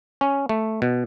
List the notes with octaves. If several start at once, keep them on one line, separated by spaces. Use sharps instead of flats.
C#4
A3
B2